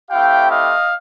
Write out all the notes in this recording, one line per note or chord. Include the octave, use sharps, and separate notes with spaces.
A3 C4 E4 G4 F5 G5
D#5 F5